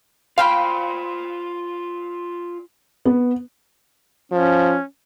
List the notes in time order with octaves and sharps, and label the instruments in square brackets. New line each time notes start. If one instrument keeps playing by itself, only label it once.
[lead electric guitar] F4 D5 [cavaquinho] C5 G5 B5 [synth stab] F5
[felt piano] B3
[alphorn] F3 [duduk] C#4